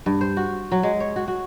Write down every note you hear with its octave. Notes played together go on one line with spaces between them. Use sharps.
G2
C5
F#4
F#3
G#3
C#5
F#4
F#4